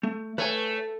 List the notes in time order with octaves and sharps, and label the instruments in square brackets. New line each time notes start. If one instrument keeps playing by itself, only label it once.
[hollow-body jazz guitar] A3
[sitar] A3 [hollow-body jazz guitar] B4 C#5 G#5